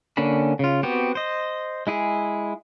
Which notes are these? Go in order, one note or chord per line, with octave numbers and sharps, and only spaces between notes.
D3 A#3 C#4 D4 B5
C#3 F4
B3 C4 F#4 G4
C5 D#5
G#3 E4 G#4